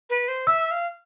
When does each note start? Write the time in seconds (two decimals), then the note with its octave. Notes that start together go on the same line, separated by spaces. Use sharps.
0.10 B4
0.28 C5
0.47 E5 E6
0.71 F5